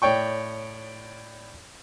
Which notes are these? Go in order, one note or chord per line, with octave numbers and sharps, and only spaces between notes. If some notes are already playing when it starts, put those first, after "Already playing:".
A2 C#5 D5 G5 C#6